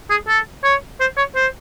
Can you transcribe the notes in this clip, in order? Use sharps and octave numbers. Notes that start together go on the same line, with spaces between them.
G#4
A4
C#5
C5
C#5
C5